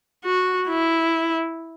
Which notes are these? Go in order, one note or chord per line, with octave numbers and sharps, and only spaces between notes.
F#4
E4